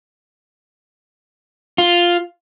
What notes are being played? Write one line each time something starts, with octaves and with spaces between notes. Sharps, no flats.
F4